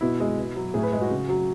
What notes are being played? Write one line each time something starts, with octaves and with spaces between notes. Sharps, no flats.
B2 E4
G#3
B2
F#3
A2 G#4
B4
G#3
F#4
C#3
F#3